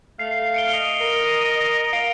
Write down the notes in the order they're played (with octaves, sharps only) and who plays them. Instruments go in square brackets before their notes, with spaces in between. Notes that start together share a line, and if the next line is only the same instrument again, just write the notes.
[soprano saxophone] A3 [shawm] F5 [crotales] C7
[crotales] C#7 D7 G7
[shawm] D#5 [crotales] F7
[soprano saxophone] A#4
[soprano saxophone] F5 [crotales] D7